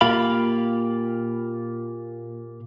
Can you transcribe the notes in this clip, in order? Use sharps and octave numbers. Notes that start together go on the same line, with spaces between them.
A#2 A#3 F4 G4 F5 B5